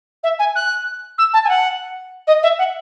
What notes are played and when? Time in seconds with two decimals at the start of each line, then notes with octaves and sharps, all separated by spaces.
0.23 E5
0.39 G#5
0.55 F#6
1.18 E6
1.33 A5
1.44 G#5
1.49 F#5
2.27 D#5
2.43 E5
2.58 F#5